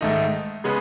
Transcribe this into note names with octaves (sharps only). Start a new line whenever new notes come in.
G#2 D#3 A3 D#4
C#3 G#3 B3